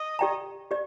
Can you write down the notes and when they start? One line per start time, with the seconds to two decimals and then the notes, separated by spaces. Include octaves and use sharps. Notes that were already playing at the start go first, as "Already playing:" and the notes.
Already playing: D#5
0.19 G4 D5 G5 A#5
0.71 G4 D5